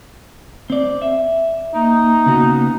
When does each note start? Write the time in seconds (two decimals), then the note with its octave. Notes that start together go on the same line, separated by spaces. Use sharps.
0.70 C4 D5
1.02 E5
1.74 A#3 D#4
2.26 C#3 B3 F#4